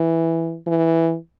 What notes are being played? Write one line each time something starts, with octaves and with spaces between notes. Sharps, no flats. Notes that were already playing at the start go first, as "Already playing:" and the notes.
Already playing: E3
E3